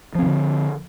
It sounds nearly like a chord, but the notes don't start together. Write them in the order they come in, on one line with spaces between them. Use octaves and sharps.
F3 C4 D#3 D3